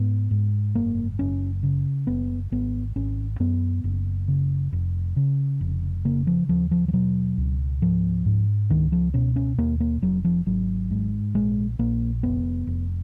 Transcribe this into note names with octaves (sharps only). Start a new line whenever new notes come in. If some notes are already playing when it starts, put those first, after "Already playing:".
Already playing: G#2 B3
G#2
F#1 A#3
F#1 C#4
C#3
F#1 B3
G#1 B3
G#1 C#4
F#2 B3
F#1
C#3
F1
C#3
F1
C#3 A#3
F3
D#2 F3
F3
F3
B2 F#3
C#2
G#2 F3
G#2
C#2 D#3
F3
B2 C#4
C#4
D#2 A#3
A#3
F1 F#3
F3
G#1 F#3
G#2
A#1 G#3
A#1 A#3
F1 B3
F1